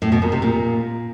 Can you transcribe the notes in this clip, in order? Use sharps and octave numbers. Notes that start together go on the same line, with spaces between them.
A2
B2
A#2
C3
A#2